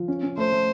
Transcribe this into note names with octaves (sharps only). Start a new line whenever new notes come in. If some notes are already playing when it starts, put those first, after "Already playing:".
Already playing: F3
C#4
C#4
A3 C5
A3